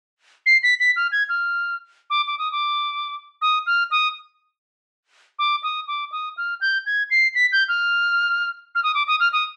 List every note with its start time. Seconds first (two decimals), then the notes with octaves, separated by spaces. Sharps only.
0.46 C7
0.63 B6
0.80 B6
0.96 F6
1.12 G#6
1.29 F6
2.10 D6
2.27 D6
2.39 D#6
2.52 D6
3.42 D#6
3.67 F6
3.91 D#6
5.39 D6
5.63 D#6
5.88 D6
6.12 D#6
6.37 F6
6.61 G6
6.86 G#6
7.11 C7
7.35 B6
7.52 G6
7.68 F6
8.75 F6
8.83 D#6
8.95 D6
9.08 D#6
9.20 F6
9.33 D#6